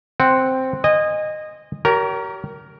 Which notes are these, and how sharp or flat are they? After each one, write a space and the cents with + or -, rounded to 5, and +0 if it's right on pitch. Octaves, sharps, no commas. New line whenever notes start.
C4 +0 F#5 +0
D#5 -15 G#5 -25
G4 -35 A#4 +0 C#5 +30